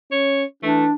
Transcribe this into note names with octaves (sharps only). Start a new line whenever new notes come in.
C#4 C#5
E3 A3 D4